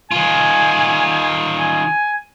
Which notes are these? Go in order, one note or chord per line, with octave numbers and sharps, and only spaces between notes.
D#3 F4 G#5
G#5